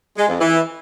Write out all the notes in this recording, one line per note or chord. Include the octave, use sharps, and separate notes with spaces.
G#3
F2
E3